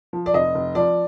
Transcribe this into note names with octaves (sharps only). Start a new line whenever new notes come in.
F3
D5
F1 D#5
F1
F3 D5